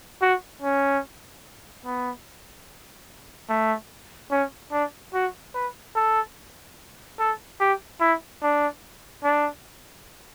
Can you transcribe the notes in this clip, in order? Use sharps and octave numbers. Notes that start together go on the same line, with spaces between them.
F#4
C#4
B3
A3
C#4
D4
F#4
B4
A4
A4
G4
E4
D4
D4